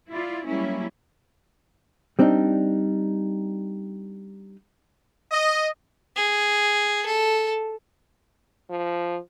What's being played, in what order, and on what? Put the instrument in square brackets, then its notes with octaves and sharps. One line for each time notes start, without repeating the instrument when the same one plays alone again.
[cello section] E4 F4 D5
F#3 G3 A#3 C#4 E4
[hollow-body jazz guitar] G3 C4 D4 D#4
[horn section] D#5
[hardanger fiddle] G#4
A4
[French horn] F3